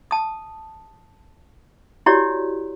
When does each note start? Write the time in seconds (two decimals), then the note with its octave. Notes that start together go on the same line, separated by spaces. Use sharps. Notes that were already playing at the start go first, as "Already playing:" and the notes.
0.11 A5 D#6
2.06 E4 F#4 G4 C#5 D5